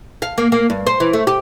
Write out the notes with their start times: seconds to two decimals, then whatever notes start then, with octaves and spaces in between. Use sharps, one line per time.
0.22 F5
0.38 A#3
0.52 A#3
0.70 G2
0.87 C5
1.00 E3
1.13 A3
1.27 G4